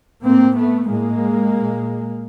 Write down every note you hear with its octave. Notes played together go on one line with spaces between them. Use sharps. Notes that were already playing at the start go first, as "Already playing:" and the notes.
A2 A#3 C4
A3 B3
A2 G#3 A#3
A#2